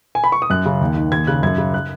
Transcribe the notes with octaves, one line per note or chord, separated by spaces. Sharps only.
G#5
B5
C#6
D#6
F#2 F#6
C#3
D#2
D#3
D#2 G#6
C#3 F#6
F#2 G#6
C#3
F#6